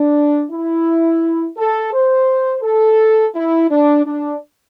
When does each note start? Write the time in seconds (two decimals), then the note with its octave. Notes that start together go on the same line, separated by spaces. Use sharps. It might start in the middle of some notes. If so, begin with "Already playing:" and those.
Already playing: D4
0.51 E4
1.57 A4
1.93 C5
2.63 A4
3.34 E4
3.69 D4
4.05 D4